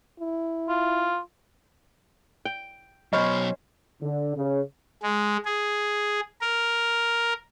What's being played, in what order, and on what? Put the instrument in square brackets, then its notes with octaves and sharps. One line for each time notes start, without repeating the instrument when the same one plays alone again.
[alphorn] E4
[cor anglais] F4
[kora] G5
[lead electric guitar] B2 F#3 [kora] C#4 C5 [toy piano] D#5 [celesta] B5 C#6 F6
[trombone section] D3
C#3
[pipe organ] G#3
G#4
A#4